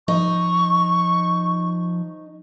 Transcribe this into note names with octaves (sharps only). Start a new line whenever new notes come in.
F3 D#4 C#6